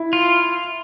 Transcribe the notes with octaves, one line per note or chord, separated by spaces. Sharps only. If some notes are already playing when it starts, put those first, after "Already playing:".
Already playing: E4
F4